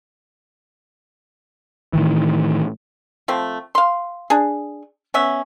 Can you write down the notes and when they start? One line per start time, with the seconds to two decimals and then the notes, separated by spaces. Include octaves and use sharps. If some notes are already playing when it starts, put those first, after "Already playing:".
1.93 A2 D#3 E3
3.28 F3 A3 C4
3.75 F5 C6
4.30 D4 G#4
5.14 B3 C#4 E5